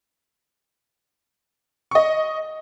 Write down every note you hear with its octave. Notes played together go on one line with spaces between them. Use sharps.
D#5 C#6